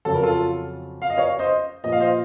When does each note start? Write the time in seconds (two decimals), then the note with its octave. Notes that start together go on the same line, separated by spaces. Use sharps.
0.05 F2 C#3 F#3 A4
0.14 A#4
0.23 F4 A4
1.02 F5
1.10 D#5
1.17 C#5 F5
1.39 C5 D#5
1.84 A#2 F3 D#5
1.92 F5
2.00 C5 D#5